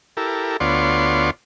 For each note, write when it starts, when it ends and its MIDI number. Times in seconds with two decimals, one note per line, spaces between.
0.17 0.57 64
0.17 0.57 67
0.17 0.57 69
0.17 0.57 70
0.60 1.30 38
0.60 1.30 59
0.60 1.30 65
0.60 1.30 73
0.60 1.30 74
0.60 1.30 84